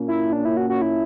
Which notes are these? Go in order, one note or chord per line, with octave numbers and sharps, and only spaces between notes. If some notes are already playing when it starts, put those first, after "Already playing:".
Already playing: A#2 A#3 C#4
E4
D4
E4
F#4
F#4
E4